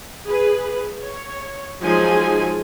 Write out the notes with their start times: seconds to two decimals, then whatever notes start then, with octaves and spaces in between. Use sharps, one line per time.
0.28 G#4 B4
1.03 C#5
1.83 F3 F#3 G#3 D#4 G#4 G#5